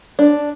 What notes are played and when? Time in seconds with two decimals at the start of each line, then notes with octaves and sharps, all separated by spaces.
0.19 D4